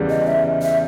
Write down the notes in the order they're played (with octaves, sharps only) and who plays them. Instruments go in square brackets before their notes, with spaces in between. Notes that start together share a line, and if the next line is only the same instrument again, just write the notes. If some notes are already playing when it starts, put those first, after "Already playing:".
Already playing: [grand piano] E2 C#3 G3
[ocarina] D#5
E5
E5